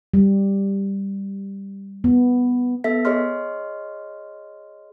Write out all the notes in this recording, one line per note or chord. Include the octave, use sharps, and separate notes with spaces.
G3
B3
B3 A4 E5 B6
G#4 C#5 D#5 C6 F6